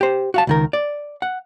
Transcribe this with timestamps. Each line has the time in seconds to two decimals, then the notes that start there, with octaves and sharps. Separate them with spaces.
0.01 G4 C5
0.34 F#4 F5 A5
0.47 C#2 D#3 A#4
0.73 D5
1.22 F#5